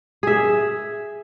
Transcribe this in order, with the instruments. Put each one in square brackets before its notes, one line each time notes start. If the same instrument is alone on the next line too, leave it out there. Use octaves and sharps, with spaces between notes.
[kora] G#4 E5